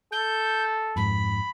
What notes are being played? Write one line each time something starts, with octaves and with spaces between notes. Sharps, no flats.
A4 G6
F2 G#2 B5